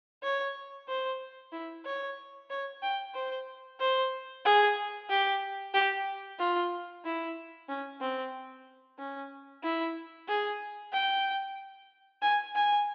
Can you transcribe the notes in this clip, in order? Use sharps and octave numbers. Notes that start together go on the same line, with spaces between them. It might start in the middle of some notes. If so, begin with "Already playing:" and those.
C#5
C5
E4
C#5
C#5
G5
C5
C5
G#4
G4
G4
F4
E4
C#4
C4
C#4
E4
G#4
G5
G#5
G#5